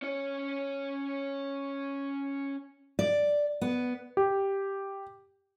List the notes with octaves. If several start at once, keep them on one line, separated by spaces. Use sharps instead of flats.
C#4 C#5
D5
B3
G4